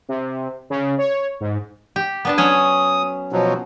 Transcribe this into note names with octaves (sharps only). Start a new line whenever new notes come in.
C3
C#3
C#5
G#2
G4
B3 D4 A5
F#3 C#4 G#5 D#6
B2 F3 F#3